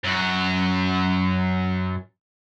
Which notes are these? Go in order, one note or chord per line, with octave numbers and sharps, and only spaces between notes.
F#2 F#4